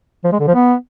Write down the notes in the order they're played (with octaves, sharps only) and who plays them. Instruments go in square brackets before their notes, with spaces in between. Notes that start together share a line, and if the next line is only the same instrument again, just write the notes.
[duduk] F3
G#3
D3
F3
B3